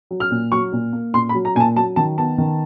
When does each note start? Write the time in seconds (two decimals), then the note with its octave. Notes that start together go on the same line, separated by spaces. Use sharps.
0.11 F#3
0.20 F6
0.31 A#2
0.51 F#3 C#6
0.72 A#2
0.93 A#3
1.14 A#2 C6
1.29 B5
1.34 F#3
1.45 A#5
1.55 A#2 G#5
1.60 A5
1.76 F#3 A5
1.96 D#3 A5
2.18 B3 A5
2.38 D#3